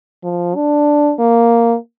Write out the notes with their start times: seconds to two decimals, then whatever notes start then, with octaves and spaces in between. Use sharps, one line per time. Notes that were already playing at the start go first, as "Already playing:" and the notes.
0.24 F3
0.55 D4
1.19 A#3